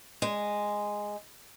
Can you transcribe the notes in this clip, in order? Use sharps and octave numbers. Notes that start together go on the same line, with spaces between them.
G#3